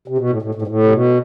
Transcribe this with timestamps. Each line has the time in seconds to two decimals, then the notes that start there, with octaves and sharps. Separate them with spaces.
0.08 C3
0.18 B2
0.30 A2
0.42 A2
0.55 A2
0.62 G#2
0.67 A2
0.83 C3
0.92 B2